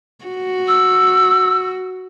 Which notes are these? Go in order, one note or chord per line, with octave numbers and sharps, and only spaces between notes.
F#4
E6